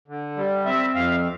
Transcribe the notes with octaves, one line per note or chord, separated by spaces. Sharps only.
D3
G3
C4 E5
F2 F5